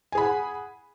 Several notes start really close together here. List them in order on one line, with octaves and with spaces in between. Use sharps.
G#5 G#4 B5 F#5